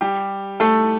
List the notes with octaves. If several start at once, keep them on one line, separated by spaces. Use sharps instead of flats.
G3 G4
A3 A4